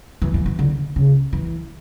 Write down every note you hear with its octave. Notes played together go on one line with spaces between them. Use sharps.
E3
E3
E3
D3
C#3
E3